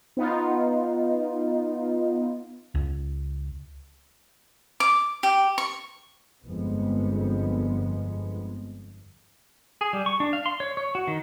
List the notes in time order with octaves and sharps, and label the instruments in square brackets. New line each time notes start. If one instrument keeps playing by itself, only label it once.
[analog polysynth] B3 D#4 F4
[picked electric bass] C#2
[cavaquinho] D6
G4
C#6
[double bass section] G1 F2 G#3 B3
[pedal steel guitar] G#4
G3
C#6
D4
F5
C6
C#5
C#5
F#4
D#3